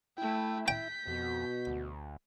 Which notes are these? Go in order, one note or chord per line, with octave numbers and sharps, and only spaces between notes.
A3 E4 G5
G5 G6 B6
F2 B2 F#4
D2